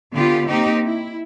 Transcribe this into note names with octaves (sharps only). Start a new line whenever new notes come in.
D3 B3 F4 G4
A#3 C4 D#4 G4
E4